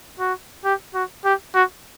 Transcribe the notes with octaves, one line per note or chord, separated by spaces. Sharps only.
F#4
G4
F#4
G4
F#4